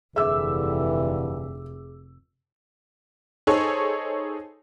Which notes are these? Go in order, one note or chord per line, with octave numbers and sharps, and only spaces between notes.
F1 G2 D3 E3 G#4 E5 D6 E6
D#4 G#4 A4 C5 C#5